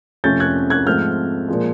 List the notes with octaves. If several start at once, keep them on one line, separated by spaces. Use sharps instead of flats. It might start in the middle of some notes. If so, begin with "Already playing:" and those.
F2 C3 F3 A3 C#4 G6 A6
F#6 G#6
F#6 G#6
G#2 F3 A3 C4 F6 G6
A#2 F3 G#3